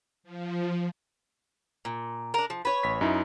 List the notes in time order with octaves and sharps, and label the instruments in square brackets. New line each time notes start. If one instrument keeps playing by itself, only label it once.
[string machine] F3
[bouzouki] A#2
D4 A#4
F3
B4 C#5
[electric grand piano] A1 B6
F#2 D#4 E4